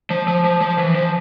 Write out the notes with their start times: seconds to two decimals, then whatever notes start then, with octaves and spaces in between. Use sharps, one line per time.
0.10 F3
0.28 F3
0.44 F3
0.61 F3
0.78 E3
0.95 F3